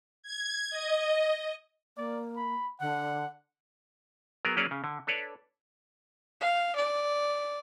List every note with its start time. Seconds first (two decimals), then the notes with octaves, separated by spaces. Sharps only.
0.23 G#6
0.70 D#5
1.97 A#3 D5
2.37 B5
2.80 D3 F#5
4.45 F#3 B3 G#4 A#4
4.57 F#3 A#3 C#4 G#4 C#5 D5
4.71 C#3
4.84 D3
5.07 D4 A4 B4 C#5 D5
6.41 F5
6.76 D5